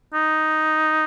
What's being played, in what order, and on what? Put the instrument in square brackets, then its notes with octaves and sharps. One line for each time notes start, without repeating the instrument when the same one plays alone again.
[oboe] D#4